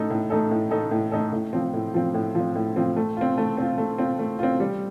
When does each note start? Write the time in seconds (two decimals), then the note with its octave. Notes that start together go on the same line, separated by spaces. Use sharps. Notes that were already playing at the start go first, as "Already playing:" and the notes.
Already playing: A2 A3 D#4 A4
0.10 A2
0.30 A3 D#4 A4
0.51 A2
0.71 A3 D#4 A4
0.91 A2
1.12 A3 D#4 A4
1.33 A2
1.53 F3 C4
1.73 A2
1.94 F3 C4
2.14 A2
2.35 F3 C4
2.55 A2
2.76 F3 C4
2.96 A3
3.17 C4 F4
3.38 A3
3.57 C4 F4
3.78 A3
3.98 C4 F4
4.19 A3
4.39 C4 F4
4.60 G3